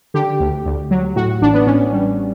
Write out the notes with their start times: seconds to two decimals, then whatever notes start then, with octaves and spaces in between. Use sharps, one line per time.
0.14 D3 G4
0.40 D2
0.66 D2
0.91 F#3
1.16 A2 F#4
1.41 A1 D4
1.54 B3
1.66 A1 C#4
1.93 G3